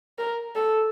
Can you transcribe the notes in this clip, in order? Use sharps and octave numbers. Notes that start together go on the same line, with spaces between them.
A#4
A4